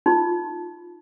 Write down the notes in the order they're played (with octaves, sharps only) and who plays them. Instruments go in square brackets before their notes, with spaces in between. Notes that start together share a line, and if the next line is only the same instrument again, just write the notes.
[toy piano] D#4 F4